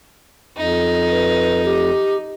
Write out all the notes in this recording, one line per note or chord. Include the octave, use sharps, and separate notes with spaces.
F2 D#4
B4
G4